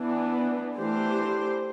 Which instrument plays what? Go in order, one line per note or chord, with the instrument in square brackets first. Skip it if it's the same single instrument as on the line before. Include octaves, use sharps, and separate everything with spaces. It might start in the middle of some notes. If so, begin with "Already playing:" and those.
Already playing: [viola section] E3 B3 D4
E3 A3 D4 G4 C5